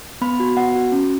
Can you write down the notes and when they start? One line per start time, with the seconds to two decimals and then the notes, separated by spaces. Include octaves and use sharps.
0.21 B3 B5
0.40 F#4
0.57 B3 F#5
0.75 F#4
0.92 C#4